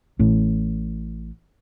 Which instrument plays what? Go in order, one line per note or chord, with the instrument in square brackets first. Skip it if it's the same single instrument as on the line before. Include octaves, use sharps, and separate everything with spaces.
[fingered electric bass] A1 A2